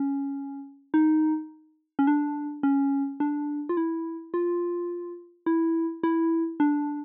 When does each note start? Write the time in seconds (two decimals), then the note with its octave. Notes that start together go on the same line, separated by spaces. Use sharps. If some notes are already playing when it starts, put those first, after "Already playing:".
Already playing: C#4
0.94 D#4
1.99 C#4
2.07 D4
2.63 C#4
3.20 D4
3.69 F4
3.77 E4
4.34 F4
5.46 E4
6.03 E4
6.60 D4